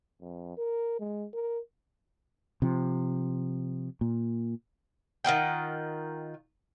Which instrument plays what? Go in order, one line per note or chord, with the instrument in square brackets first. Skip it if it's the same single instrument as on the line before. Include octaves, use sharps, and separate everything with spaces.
[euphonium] F2
A#4
G#3
A#4
[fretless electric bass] C3 F3
A#2
[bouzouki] D#3 F4 F#5 G5